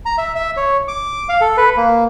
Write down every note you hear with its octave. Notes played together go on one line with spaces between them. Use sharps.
A#5
E5
E5
C#5
D6
F5
A4
B4
A#3